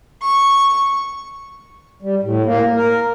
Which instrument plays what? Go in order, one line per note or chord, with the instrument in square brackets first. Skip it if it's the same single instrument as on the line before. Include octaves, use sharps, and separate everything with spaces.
[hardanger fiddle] C#6
[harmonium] G3
A2
A#3
A#4